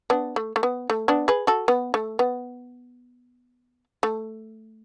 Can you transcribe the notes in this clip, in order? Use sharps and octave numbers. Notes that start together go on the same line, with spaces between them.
B3 D4
A3
A3
B3
A3
B3 D4
G#4 B4
F#4 A4
B3
A3
B3
A3